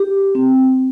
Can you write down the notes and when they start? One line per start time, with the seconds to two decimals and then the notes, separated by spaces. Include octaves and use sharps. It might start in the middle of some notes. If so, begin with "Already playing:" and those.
Already playing: G4
0.35 C4